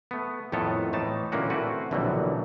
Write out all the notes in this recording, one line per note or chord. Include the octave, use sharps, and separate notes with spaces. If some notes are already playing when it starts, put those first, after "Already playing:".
A3 B3
F2 A2 D#3 B3 A4 C#5
A2 E3 A3 D#4 A5
A#2 D3 E3 A#3 C#4 F#4
A3 C4 E4 F#4 B4
A#1 B2 D3 E3 F#3 G3